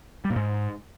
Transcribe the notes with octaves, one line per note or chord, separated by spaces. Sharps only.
G3
A#2
G#2